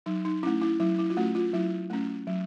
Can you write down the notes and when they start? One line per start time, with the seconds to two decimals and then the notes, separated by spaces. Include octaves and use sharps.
0.06 F#3 D#4
0.25 D#4
0.43 A3 C#4 E4
0.61 E4
0.80 F#3 E4
0.98 E4
1.10 F4
1.17 A3 C#4 F#4
1.35 F4
1.53 F#3 E4
1.90 A3 C#4
2.27 F#3